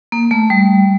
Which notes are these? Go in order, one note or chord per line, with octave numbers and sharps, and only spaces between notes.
A#3
A3
G3